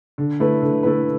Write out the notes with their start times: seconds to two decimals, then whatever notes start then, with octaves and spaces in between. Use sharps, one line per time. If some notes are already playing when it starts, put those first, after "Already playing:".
0.18 D3
0.40 A3 E4 B4
0.62 D3
0.83 A3 E4 B4